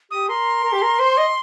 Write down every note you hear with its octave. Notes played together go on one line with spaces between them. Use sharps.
G4 D#6
A#4 C6
A#4
G4
A#4
C5
D#5